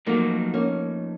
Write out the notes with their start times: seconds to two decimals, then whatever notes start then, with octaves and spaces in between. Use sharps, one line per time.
0.06 F3 F#3 A3 A#3 D#4
0.54 A#3 C#4